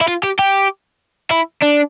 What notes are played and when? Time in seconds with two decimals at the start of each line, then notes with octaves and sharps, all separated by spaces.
0.01 E4
0.08 F4
0.23 G4
0.39 G4
1.31 E4
1.62 D4